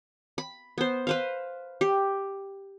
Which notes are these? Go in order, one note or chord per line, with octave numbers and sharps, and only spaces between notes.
B5
B3 C5
B4 C5 F5
G4